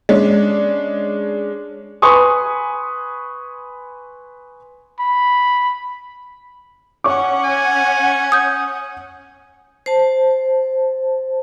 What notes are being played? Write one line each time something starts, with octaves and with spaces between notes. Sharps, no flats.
G#3 C#4 D4
B4 G#5 C6 C#6 D#6
B5
C#4 C#5 F#5 C#6 D6
G#5
D#6 G6
C5 A5